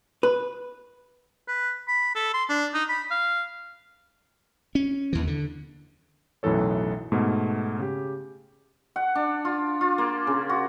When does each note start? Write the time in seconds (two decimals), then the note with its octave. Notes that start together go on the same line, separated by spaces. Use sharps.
0.23 B4
1.48 B4
1.88 B5
2.15 A4
2.34 C6
2.49 D4
2.74 D#4
2.89 B5
3.11 F5
4.75 C#4
5.13 D#2 E3
5.27 D3
6.43 B1 F#2 A2 E3 A4 C#5
7.12 G#2 B2 A3
7.79 C#3 G4
8.96 F#5
9.15 D4
9.45 F4
9.81 F4
9.98 A#3
10.27 C#3
10.49 F#4